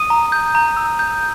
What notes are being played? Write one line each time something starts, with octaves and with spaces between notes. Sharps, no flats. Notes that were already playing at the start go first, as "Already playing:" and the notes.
Already playing: D#6 D#7
A#5
G6
A#5
E6
G6